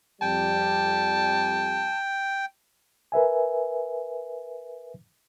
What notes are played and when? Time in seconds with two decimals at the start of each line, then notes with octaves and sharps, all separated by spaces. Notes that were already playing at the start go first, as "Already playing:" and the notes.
0.22 F2 G3 G5 A5
3.12 A#4 B4 E5 G#5